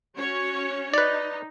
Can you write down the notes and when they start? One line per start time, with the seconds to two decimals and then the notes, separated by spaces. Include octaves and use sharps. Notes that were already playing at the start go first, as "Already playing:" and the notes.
0.17 C#4 F#4 C#5
0.94 D#4 B4 D5